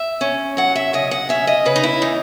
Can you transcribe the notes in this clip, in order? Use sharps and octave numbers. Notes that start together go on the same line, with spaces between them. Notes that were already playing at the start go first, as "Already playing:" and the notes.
Already playing: E5
C#4
F#3 F#5
E5
C#3 D#5
F#5
C#4 E5
D#5
C#3 B4
D#4
E4
E3 D#4